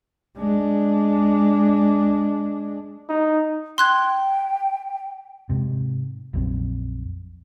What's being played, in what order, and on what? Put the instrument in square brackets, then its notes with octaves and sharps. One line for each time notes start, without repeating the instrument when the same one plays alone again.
[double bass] G#3 D4
[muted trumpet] D#4
[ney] G5 [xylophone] C6 F#6 G#6
[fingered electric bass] G#2 C3
A#1 F2 F#3 C4